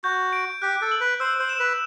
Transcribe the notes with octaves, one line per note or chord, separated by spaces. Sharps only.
F#4 G6
D7
G4 F#6
A4
F#7
B4
C5 E6
C5
E7
B4